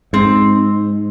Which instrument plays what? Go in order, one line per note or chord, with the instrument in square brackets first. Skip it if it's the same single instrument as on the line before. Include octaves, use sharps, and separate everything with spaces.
[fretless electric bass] G#2 [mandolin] C4